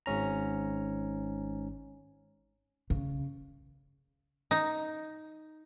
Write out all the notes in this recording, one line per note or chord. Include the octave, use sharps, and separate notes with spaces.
G#1 G#2 C#4 A#5
C#3
D#4